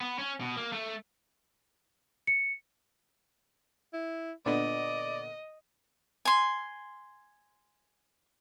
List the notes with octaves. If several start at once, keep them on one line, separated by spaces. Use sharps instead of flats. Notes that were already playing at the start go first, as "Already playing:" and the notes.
B3
C#4
B2
A#3
A3
C#7
E4
A#2 D3 B3 D5 D#5
G#5 C6